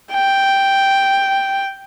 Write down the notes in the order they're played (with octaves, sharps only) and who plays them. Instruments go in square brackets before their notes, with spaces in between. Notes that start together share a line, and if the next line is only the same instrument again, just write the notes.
[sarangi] G5